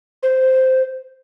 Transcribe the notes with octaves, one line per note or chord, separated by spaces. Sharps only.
C5